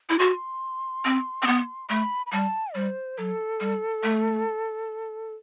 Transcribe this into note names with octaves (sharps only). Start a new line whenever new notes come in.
E4
F#4 C6
C4
C4
B3
A3 B5
B5
G3 A5
G3 C5
F#3 A4
G3
A3